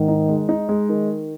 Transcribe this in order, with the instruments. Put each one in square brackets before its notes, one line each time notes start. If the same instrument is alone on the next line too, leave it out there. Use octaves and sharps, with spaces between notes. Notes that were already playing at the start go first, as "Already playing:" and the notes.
Already playing: [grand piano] G#2 [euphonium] D#3
[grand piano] D#4
G#3
D#4
G#3
D#3